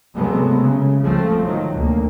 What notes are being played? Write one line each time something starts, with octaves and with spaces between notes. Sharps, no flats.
C3 F#3 G#3 A3 B3
C#3
F3 A3 C4
D#3 F#3
D2 A#3